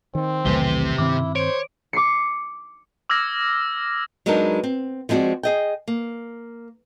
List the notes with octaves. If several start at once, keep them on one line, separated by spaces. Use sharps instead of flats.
D#3 C4
B1 E2 C3 D#3 A3 G4 G7
G2 D#3 C4 E4 D6
C5 C#5 D7
D6 C7 C#7
D6 E6 F6 G#6 A#6
F#3 G#3 B3 D4 D#4 A#4
C4
F3 G#3 C4 D#4 F#4 D5
G#4 D#5 G5
A#3